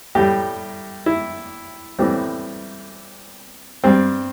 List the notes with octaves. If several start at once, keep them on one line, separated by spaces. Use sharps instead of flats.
A2 G3 G4
E4
A2 E3 G3 C4
G2 G3 C4